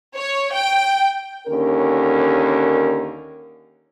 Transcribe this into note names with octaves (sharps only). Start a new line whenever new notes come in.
C#5
G5
D#2 D3 C#4 A#4